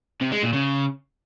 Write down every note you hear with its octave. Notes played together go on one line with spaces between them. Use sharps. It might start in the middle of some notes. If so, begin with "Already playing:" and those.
C3
G#3
A#2
C#3